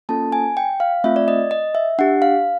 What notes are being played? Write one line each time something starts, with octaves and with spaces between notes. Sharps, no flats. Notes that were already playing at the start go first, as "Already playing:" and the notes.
A#3 C#4 F4 A4 A5
G#5
G5
F5
A3 C4 F4 E5
D5
D#5
D#5
E5
D4 G4 F#5
F5